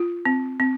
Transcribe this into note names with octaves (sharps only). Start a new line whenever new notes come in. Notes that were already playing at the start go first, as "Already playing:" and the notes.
Already playing: F4
C4
C4